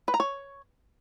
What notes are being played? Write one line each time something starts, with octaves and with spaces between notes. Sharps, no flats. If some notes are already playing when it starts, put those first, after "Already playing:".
B4
A#5
C#5